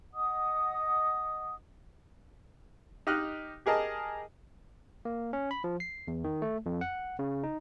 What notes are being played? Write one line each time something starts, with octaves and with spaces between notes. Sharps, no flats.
D#5 F#5 D#6
D#4 G4 D#5 F6 F#6
G4 G#4 A#4 D#5 A5
A#3
C#4
B5
F3
C7
E2
D#3
A3
F2
F#5
C#3
D#4